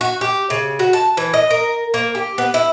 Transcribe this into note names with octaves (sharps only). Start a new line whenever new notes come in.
F#4
G4
C#3
F#4
A5
E3
D#5
A#4
A#3
G4
B3
E4